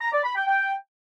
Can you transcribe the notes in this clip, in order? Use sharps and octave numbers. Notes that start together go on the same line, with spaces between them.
A#5
D5
B5
G5
G5